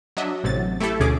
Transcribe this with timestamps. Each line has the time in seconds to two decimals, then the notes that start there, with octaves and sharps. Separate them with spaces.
0.17 F#3 D4 D#5 E5
0.44 A1 C3 F#3 A6
0.80 A3 E4 G4 A4
1.00 D2 B2 C#4 G#4 D6